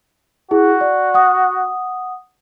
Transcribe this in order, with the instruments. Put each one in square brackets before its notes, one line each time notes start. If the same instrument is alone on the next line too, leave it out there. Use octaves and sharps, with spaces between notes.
[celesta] E4 G#4 [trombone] F#4
[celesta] D5
F#5 D#6